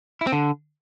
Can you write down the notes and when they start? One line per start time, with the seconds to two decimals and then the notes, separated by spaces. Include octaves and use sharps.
0.21 E4
0.27 C4
0.32 D3